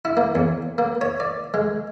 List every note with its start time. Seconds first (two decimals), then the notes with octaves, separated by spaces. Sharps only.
0.05 E4
0.17 A#3
0.35 E2
0.78 A#3
1.01 C#5
1.20 D5
1.54 G#3